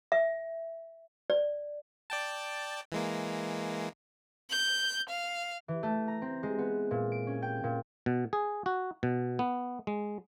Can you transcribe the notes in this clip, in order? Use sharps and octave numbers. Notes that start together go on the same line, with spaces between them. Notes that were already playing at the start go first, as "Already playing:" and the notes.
E5
D5
D5 G5 A5
E3 G#3 A#3
G6
F5
E3
A3
A#5
C4
G#3
B3
A#2
D7
C#4
G5
A#2
B2
G#4
F#4
B2
B3
G#3